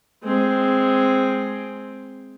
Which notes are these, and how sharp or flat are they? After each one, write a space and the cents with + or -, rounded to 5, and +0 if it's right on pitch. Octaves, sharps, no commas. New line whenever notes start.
G#3 +0 C4 +0